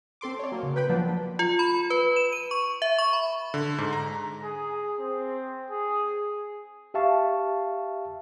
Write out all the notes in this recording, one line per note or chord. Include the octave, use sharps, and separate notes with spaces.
C4 A4 C6 D6
C#5 D5
F#3 A#3
C#3
B4 G5 B5
F3 F#3 A#3 B3 D4
F4
B5
B4
E7
D#7
C#6
E5
C#6
B5
D3
G#2
A#5
G#4
C4
G#4
G4 E5 F5 A5 C#6